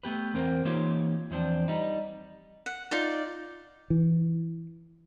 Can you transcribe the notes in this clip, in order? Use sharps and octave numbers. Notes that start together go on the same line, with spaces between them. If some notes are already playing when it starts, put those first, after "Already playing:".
A3 B3 G4 B4
E2 C4 A#4 C5
E3 A#3 D#4 F4 G4 C#5
E2 F3 C4 D4
G3 D#4
F#5
D#4 F4 D5
E3